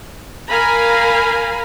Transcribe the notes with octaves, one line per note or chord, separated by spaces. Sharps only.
A#4 F5 G#5 A#5 B5